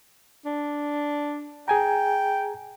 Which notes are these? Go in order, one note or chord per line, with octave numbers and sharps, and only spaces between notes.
D4
G#4 G5 G#5 A#5